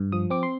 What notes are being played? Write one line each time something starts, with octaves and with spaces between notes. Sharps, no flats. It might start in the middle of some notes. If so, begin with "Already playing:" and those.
Already playing: G2
F3 D#6
C4 D6
C6